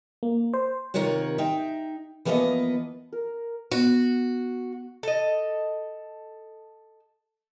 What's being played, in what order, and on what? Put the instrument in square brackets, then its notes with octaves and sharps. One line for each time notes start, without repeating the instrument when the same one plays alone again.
[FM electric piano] A#3
C5
[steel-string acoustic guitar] C3 D#3 F4 A#4 C#5 F#5
D#4 E5 G5
E3 F3 A#3 B3 C#5 D#5
[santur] A#4
[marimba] B3 [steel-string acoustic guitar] F#4
[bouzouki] A4 D#5